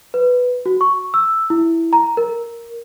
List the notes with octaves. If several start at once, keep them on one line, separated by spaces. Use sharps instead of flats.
B4
F#4
C#6
E6
E4
A#5
A#4